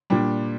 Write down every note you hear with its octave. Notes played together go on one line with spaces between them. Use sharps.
A#2 G3 D4